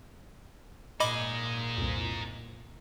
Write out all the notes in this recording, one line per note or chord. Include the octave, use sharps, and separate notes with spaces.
A#2 D#4 G#4 D#5 B5 D6
C2 F2